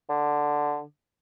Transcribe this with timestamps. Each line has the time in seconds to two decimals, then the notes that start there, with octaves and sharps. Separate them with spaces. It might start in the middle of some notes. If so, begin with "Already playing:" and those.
0.09 D3